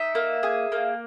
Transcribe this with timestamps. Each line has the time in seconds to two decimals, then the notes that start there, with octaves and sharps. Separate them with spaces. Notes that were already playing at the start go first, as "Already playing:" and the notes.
Already playing: D#4 E5
0.15 A#3
0.43 G#4
0.72 A#3